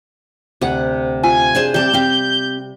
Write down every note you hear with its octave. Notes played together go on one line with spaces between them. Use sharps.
D2 C3 F#5
F4 G#5
D4 G#4 C5
C3 G3 D5 A5 G6
C4 G4 F5